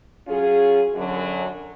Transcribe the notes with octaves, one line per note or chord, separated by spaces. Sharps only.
F#3 C#4 F4 G#4
F#2 D3 F#3